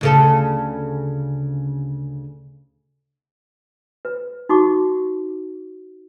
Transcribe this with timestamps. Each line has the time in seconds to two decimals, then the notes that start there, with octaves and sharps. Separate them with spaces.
0.01 D2 C#3 A4
4.05 B4
4.49 D#4 F#4 C#6 D6